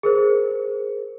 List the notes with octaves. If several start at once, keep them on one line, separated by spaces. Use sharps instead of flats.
G#4 A#4 C5